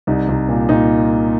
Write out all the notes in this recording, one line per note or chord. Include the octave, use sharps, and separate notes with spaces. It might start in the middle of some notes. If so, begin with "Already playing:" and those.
C2 D#4
C2
A#2
A#2 D#4